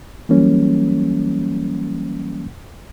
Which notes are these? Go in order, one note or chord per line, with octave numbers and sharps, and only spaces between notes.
E3 F#3 G3 A#3 C#4